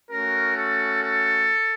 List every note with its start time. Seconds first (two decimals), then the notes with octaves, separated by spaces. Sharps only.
0.10 A3 C#4 F#4 A#4
0.56 A4
1.01 A4